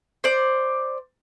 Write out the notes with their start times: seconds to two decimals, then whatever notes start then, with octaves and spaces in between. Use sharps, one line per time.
0.24 C5 D5